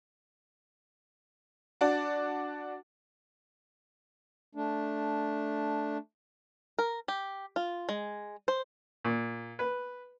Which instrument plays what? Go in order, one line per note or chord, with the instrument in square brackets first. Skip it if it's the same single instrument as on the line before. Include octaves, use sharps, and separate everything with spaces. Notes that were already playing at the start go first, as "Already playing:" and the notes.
[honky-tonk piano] D4 F#4 D5
[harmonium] A3 D4
[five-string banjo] A#4
G4
F4
G#3
C5
[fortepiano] A#2
B4